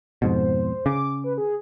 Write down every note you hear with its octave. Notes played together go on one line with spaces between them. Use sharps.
F2 G#2 B2 C5
C#3 D6
B4
G#4